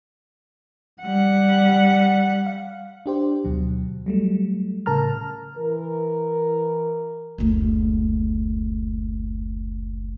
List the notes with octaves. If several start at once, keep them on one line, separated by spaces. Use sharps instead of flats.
G3 F#5
F5
D4 G4 C5
D2 B2 F#3
F#3 G3 A3
A2 C#3 A#4 A5 A#5 F6
E3 A#4
F#1 D2